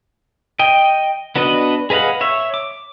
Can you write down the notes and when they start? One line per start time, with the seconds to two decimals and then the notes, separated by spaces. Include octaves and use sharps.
0.59 D#5 G5
1.36 B3 D4 F#4 B4 D#5
1.90 G#4 B4 D#5 F5 F#5
2.21 C#5 E5
2.54 D6